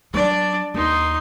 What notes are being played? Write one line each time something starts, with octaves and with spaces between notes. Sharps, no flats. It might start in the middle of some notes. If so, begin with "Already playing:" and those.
F#3 D4 D5
D#2 D#4 C6